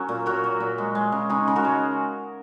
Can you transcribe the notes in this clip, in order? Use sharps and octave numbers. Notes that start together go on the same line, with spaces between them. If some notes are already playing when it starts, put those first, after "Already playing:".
Already playing: F#3 C#4 A#4
A#2
F#3 F#4 A#4
F#3
A#2
G#3
G#3
C#3
C#3 D#4 G#4
C#3
F#4 A#4
G#3